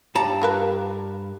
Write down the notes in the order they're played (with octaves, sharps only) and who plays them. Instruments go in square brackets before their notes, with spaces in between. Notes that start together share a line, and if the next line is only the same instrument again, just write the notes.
[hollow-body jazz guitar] G2 A5 A#5
[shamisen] F4 A#4 B4